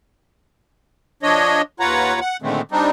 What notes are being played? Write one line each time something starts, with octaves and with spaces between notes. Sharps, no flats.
F3 D4 C#5 D#5
D#2 F4 B4 C#5 F#5 A#5
F#5
A#2 D3 D#3 G#3 A3 C4
G3 C4 D4 D#4